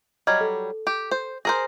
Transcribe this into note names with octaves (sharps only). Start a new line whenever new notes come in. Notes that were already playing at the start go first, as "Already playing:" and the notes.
F#3 G3 D#5 F6 G#6
A4
G4
C5
G#4 A#4 C5 A#6